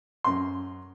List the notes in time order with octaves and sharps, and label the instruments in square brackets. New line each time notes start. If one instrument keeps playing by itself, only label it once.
[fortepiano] F#2 C6